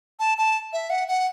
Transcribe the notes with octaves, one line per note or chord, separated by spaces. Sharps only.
A5
A5
E5
F#5
F#5